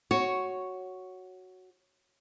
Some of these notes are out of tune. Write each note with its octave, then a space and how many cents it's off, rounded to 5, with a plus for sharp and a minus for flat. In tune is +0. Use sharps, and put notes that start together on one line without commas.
F#4 +0 C#5 +0